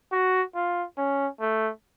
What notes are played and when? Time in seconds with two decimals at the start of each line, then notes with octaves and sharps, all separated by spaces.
0.12 F#4
0.55 F4
0.98 C#4
1.40 A3